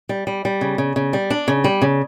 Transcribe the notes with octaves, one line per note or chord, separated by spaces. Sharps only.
G3
G3
G3
C#3
C#3
C#3
G3
D4
C#3
G3
C#3